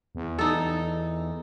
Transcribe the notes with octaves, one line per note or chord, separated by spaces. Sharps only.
E2
D#4 A4